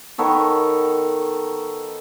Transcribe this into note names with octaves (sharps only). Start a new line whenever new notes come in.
D#3 B3 A4 C#5